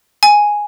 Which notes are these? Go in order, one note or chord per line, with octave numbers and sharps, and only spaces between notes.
G#5